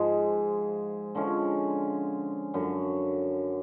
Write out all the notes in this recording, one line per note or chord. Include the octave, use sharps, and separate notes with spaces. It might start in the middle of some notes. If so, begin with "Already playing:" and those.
Already playing: G#2 F3 G#3
D3 F3 G#3 C#4
F#2 D3 F#3